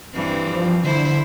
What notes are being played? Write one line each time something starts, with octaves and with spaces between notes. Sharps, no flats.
G2 E3 C4
F3
D3 E4 C5